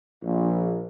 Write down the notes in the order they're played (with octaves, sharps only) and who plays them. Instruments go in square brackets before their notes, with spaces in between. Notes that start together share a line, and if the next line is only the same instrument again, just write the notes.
[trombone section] A#1